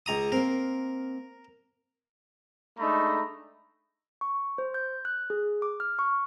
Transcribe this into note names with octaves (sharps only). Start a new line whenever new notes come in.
C#2 A#5 D#6
A#3 C4 A#4
G#3 A3 D4 D#4 A#5 B5
C#6
C5
G6
F#6
G#4
D6
F6
C#6